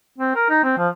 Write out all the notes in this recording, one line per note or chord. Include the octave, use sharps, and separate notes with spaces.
C4
A#4
D#4
C4
F3